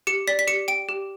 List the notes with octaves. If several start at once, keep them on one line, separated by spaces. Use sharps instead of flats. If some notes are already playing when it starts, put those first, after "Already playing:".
G4 C#7
D5 B6
B6
G4 C#7
G5 D7
G4